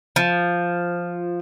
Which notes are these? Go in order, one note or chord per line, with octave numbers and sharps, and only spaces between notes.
F3